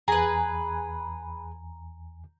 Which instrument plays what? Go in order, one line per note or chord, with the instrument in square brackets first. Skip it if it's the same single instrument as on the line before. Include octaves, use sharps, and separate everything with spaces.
[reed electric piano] E2 G#5 [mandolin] G#4 B4 [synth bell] A#5